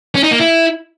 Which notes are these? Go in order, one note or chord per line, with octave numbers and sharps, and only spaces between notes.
C#4
D#4
A#3
E4